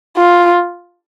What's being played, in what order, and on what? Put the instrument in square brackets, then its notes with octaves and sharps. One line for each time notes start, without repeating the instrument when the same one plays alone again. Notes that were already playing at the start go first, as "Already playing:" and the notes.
[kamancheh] F4